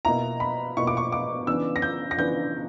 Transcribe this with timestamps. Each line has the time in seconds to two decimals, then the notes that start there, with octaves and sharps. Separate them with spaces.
0.05 B2 A#3 E4 A#5
0.40 B5
0.77 B2 A#3 E4 C#6
0.87 D6
0.97 C#6
1.12 D6
1.47 C#3 E3 B3 D4 E6
1.76 A#6
1.82 G6
2.11 A#6
2.18 C#3 E3 B3 D4 G6